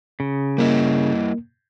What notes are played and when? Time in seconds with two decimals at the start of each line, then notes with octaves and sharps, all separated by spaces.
0.20 C#3
0.58 G3 A#3 E4 D#5